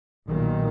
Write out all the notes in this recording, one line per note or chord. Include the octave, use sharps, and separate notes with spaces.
B1 A#2 D#3